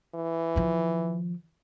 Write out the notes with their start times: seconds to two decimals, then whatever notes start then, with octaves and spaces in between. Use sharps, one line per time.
0.15 E3
0.56 D#3 F3